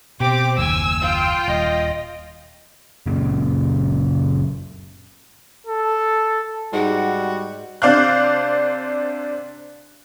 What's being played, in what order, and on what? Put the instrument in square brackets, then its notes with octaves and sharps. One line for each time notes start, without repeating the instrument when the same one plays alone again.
[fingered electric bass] B2 [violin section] C4 D6 [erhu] G4
[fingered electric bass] F#1 D#2 [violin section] G#5 [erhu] E6
[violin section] F4 G5
[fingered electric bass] D#1 [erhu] D#5
[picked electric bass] F#2 A#2 C#3
[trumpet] A4
[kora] G#2 [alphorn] G3 [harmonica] F#4 [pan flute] F#5
[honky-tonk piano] C3 D4 C5 F5 D6 F#6